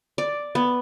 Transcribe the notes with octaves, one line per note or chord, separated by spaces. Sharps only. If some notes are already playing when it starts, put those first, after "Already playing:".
D5
B3